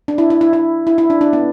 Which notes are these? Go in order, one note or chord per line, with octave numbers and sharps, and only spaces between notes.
D4
E4
E4
E4
E4
E4
E4
D4
D4
B3